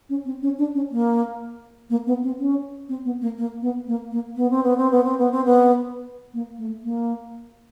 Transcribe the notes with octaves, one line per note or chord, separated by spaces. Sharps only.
C#4
C4
C#4
D4
C#4
A#3
A#3
B3
C4
C#4
C4
B3
A#3
A#3
B3
A#3
A#3
B3
C4
B3
C4
B3
C4
B3
C4
B3
A#3
A3
A#3